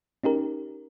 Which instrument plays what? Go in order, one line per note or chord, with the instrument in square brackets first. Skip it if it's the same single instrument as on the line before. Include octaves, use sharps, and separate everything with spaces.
[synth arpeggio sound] C#4 D#4 G4 A#4